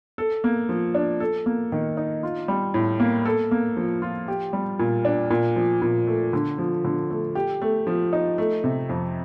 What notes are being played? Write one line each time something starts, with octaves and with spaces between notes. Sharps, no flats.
A4
A#3
F3
D4
A4
A#3
D#3
D#4
F4
G3
A2
A#3
A4
A#3
F3
F4
G4
G3
A#2
D4
A#2
F3
A#2
A3
D3
F3
D3
A3
G4
A3
F3
D#4
A3
C3
F2